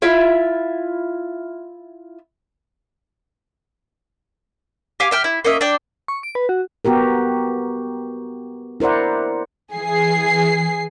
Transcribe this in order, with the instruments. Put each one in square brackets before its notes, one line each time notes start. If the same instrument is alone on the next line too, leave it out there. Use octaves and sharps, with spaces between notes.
[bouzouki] E4 F4 E5
[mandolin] G4 F5 G#5
E5 G5 F6
E4
A#3 C#4 D#5 E5
D4 D5 G5
[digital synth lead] C#6
D7
B4
F#4
[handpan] B3 F#4 G4 A#4
E4 A#4 C5 D5 F#5
[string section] E3 G#4 C7